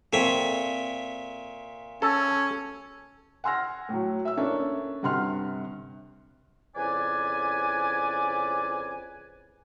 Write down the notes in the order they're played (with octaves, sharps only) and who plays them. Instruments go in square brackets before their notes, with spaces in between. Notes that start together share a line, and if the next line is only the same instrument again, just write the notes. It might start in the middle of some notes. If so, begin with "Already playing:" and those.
[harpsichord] A#2 C#5 E5 [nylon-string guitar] C4 A4
[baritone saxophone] C#4 [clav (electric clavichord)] A4
[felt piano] F#5 G#5 C6 E6 F6 A#6
A2 F#3
E5 E6
A#3 C#4 D4 A4 E5
G1 G2 C3 F#5 C6 F6
[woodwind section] F2 C#3 E4 B4 D5 G#5